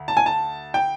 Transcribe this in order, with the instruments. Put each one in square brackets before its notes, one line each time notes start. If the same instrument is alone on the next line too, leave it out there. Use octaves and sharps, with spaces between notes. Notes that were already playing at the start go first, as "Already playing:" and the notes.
Already playing: [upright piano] D2
A5
G#5
A5
G5